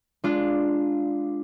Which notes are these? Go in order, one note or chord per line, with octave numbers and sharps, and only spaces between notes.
G#3 D4 F4